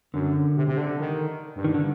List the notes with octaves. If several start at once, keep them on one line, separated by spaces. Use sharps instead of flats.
F#2 D3
C3
C3
D3
D#3
G2
D#3
D3